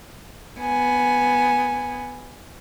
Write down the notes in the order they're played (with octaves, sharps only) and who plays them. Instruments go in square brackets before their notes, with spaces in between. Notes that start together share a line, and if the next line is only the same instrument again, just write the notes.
[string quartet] B3 G#5